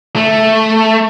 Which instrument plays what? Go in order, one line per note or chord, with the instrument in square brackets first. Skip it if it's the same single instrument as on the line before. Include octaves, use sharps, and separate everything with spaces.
[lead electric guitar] A3